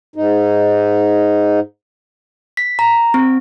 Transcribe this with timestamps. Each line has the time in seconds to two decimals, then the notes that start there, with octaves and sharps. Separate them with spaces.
0.16 G#2 D#4
2.57 B6
2.79 A#5
3.14 C4